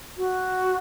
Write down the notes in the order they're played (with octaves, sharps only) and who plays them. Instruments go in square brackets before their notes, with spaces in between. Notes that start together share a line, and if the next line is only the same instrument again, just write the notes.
[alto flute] F#4